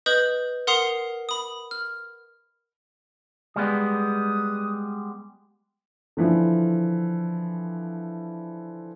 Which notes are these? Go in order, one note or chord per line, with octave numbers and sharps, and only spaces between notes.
B4 D#5 D#6 G6 F#7
A#4 F#5 C6 D#6 C7 F7
B5 D#6
F6
G3 G#3 B3 D#6
D3 E3 F3